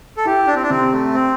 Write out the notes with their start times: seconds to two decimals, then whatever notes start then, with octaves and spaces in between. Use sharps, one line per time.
0.17 A4
0.25 E4 G4
0.47 D4
0.55 C4
0.62 D4
0.70 C3 C4
0.92 A3
1.14 C4